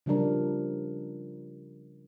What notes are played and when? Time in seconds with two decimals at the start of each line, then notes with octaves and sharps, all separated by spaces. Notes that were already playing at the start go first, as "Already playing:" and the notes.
0.06 C#3 F3 G3 D4 A#4